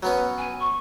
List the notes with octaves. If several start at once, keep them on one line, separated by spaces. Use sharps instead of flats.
F#3 B3 C#4 B4
G#5
C#6